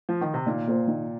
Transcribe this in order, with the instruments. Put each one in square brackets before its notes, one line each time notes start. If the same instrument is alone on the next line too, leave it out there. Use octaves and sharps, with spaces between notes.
[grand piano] F3
D#3
C3
[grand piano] A#2 [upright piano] D#3
[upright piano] A#3 F4 C5
D#3